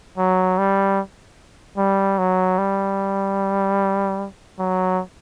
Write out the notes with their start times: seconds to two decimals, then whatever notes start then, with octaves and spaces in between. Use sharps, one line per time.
0.18 F#3
0.58 G3
1.78 G3
2.18 F#3
2.59 G3
4.59 F#3